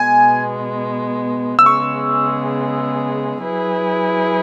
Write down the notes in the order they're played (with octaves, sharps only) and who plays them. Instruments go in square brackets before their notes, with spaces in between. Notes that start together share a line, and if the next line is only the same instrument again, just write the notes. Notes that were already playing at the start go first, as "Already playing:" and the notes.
Already playing: [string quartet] B2 G#3 B3 [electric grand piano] G#5
[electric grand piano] E6
[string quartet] C#3 G#3 B3 G#4 [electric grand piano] C#6
[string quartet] F#3 E4 G#4 B4